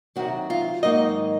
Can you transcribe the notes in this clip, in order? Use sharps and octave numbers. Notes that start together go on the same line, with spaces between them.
C3 D#3 F#3 F#4
F4
G#2 D#3 F#3 A#3 D#4 D#5